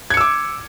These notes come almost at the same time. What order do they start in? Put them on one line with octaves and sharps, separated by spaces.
G#6 C#7 E6 D6